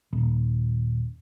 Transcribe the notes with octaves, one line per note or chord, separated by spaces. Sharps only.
D#1